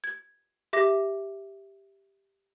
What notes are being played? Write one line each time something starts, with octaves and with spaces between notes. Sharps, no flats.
G#6
G4 E5 D6 A#6